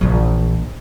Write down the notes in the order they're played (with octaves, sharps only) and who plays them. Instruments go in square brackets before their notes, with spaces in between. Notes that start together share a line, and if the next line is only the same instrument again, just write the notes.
[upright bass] A#1 E3